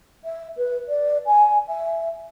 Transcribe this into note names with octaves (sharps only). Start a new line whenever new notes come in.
E5
B4
D5
G#5
E5